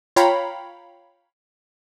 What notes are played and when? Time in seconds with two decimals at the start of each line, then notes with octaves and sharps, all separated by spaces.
0.16 F4 C#5 F5 G5 A#5 B5